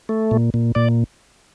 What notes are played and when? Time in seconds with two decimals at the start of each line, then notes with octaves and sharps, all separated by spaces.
0.09 A3
0.31 A#2
0.54 A#2
0.75 A#2 D5